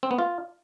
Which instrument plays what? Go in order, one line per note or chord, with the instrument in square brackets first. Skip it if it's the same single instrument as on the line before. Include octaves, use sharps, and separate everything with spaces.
[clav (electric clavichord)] C4
B3
F4